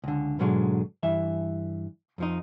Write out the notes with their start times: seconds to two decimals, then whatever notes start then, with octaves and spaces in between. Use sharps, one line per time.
0.04 C#2 D3
0.39 G#2 B2 D3 F#3 G#3
1.03 G2 E3 E5
2.18 F2 F3 D#4